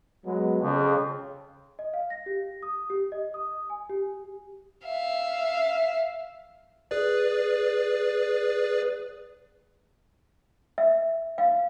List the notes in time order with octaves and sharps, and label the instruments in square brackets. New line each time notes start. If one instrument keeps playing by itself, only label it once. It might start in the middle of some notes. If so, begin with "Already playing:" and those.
[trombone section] F#3 G#3 B3
[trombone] F2 [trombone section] C#3
[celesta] D#5
F5
A#6
G4
D#6
G4
D#5
D#6
G#5
G4
[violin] E5 F5
[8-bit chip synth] G#4 B4 D5
[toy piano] E5
F5